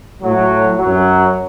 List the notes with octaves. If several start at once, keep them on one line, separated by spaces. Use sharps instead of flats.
A2 F#3
F#2 F#3